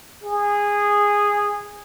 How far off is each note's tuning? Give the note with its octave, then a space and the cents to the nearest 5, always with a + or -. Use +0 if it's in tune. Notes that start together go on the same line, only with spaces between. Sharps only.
G#4 -15